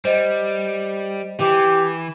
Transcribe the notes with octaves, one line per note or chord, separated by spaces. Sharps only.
G3 C5 D#5
E3 G4